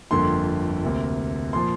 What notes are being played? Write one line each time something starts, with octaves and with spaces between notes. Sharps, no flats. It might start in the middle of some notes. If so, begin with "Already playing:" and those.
G1 F2 D3 A#3 C6
D2 C3 A#3
A#2 F3 C6